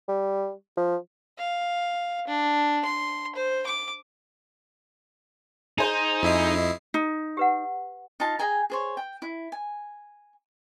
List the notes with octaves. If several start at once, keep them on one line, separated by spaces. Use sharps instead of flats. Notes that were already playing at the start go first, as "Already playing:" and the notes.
G3
F3
F5
D4
C6
C5
D6
D#4 G#4 C5
F2 E4 D#5 C7
D#4
G4 B4 F#5
D#4 F4 F5 A5
G#4 G5 G#5 A#5
G#4 C5 C#5
G5
E4
G#5